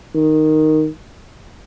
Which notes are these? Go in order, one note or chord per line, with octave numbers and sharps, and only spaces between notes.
D#3